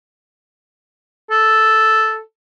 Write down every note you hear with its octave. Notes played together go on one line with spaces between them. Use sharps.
A4